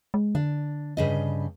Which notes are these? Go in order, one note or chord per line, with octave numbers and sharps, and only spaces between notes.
G#3
D3 D4
G2 C#3 D#5